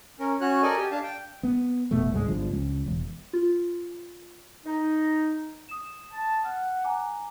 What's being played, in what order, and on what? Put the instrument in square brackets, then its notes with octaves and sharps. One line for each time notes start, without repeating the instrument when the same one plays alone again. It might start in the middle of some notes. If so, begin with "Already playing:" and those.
[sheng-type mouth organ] C#4 A#4
C#4 F#4 C#5 F#6
A4 A#4 D5 D#5 G#5
G4 G#5
D4 F5 A5
G5
[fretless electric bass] B3
F1 B2 A3
C2 G#2 F3 G#3
G1 D3 F3
C#2
E1
[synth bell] F4
[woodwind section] D#4
[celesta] D#6 E7
[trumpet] A5
[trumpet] F#5 [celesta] F6
[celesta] G#5 A#5 D6